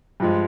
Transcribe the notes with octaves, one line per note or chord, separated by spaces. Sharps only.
G2 F3 G#3